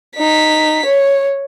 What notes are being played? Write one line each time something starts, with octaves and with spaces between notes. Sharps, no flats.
D#4 B6
C#5